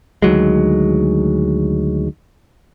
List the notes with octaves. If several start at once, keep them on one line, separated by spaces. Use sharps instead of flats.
D2 D#3 F#3 G#3